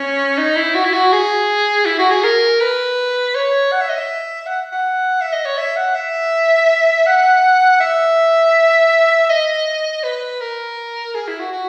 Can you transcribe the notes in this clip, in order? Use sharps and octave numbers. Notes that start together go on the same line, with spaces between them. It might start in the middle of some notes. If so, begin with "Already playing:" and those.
Already playing: C#4
D#4
E4
F#4
E4
F#4
G#4
E4
F#4
G#4
A#4
B4
C#5
F#5
E5
D#5
E5
F#5
F#5
E5
D#5
C#5
E5
F#5
E5
F#5
E5
D#5
B4
A#4
G#4
E4
F#4
F#4